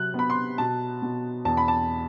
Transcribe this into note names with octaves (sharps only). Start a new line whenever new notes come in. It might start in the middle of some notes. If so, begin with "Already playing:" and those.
Already playing: C3 F#3 F#6
B3 B5
C6
B2 A5
B2
E2 A5
B5
A5